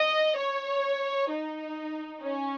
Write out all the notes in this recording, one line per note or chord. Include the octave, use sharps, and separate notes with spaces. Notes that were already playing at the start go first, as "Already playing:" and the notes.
Already playing: D#5
C#5
D#4
C#4